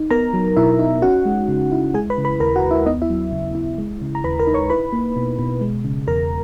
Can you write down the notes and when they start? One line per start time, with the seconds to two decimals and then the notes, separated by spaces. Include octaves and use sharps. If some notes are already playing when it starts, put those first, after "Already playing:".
Already playing: D#4
0.11 B3 A#4 A#5
0.34 F#3
0.57 B2 E4 E5
0.79 D#4
1.02 C#4 F#4 F#5
1.25 G#3
1.48 C#3
1.72 E4
1.94 G#3 G#4 G#5
2.10 B4 B5
2.18 C#3
2.25 B4 B5
2.40 D#2 A#4 A#5
2.56 F#4 F#5
2.63 D#2
2.71 E4 E5
2.86 B3 D#4 D#5
3.02 E4 E5
3.10 F#3
3.32 C#3
3.55 E4
3.78 G#3
4.02 C#3
4.15 A#5
4.24 D#2 B4 B5
4.39 A#4 A#5
4.47 D#4
4.54 C#5 C#6
4.70 E4 B4 B5
4.93 A#3
5.16 B2
5.39 B2
5.61 G#3
5.85 C#3
6.07 E2 A#4 A#5